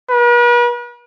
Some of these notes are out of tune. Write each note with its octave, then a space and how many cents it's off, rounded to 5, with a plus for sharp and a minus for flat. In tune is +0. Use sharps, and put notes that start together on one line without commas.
B4 -45